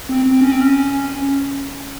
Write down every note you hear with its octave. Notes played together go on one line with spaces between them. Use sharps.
C4
C4
C#4
C4
C#4